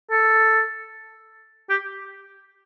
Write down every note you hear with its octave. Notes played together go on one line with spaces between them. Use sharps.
A4
G4